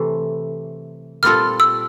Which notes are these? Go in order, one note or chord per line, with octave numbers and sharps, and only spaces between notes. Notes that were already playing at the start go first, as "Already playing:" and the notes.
Already playing: C3 E3 A3
A#2 G3 C4 F4 A4 F6
E6